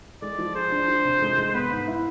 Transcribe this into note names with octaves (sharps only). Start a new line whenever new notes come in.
G#3 D5
F3
G#4 C5
D4
F4
C3
G#3
G#3
B3 B4
G#2
E4